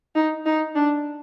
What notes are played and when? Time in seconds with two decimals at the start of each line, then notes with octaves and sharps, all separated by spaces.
0.15 D#4
0.46 D#4
0.75 D4